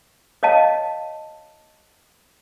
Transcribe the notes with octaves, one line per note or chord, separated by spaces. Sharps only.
C#5 D#5 F5 A5